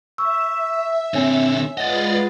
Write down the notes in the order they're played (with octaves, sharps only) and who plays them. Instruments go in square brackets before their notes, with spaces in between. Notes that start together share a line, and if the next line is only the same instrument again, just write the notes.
[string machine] E5 [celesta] C#6 [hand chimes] E6
[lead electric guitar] D3 C4 [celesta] C#5 G#5
[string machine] G#3 F4 B4 [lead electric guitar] D5 D#5 [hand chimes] F#5 A6